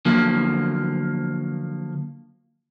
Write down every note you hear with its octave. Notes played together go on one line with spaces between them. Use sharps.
D2 D3 F3 F#3 A#3